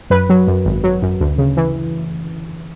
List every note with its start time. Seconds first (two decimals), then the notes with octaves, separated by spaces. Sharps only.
0.10 F#2 B4
0.29 F#3
0.47 F#2
0.65 G#1
0.84 F#3
1.02 F#2
1.20 D2
1.38 C#3
1.57 E3